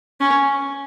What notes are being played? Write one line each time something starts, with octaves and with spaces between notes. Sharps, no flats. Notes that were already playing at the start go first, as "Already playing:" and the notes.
C#4